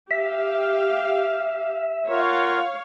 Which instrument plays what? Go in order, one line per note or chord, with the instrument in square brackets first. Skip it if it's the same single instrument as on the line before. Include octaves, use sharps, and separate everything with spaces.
[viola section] G4 F5 [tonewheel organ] E5
[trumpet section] F4 A#4 F#5 [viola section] C#5 F5